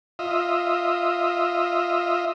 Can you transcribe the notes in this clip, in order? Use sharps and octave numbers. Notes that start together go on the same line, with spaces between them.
F4 D#5 E5